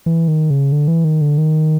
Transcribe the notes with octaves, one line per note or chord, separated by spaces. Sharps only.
E3
D#3
C#3
D3
E3
D#3
D3
D#3